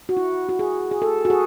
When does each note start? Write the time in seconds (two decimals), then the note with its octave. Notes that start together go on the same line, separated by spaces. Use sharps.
0.09 F#4
0.17 E4
0.49 F#4
0.59 G#4
0.91 G#4
1.02 A4
1.25 F#4
1.30 G#4